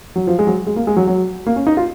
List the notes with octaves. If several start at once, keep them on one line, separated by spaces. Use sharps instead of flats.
F#3
F3
G#3
F#3
G#3
A#3
G#3
F#3
F#3
A#3
C#4
D#4
F4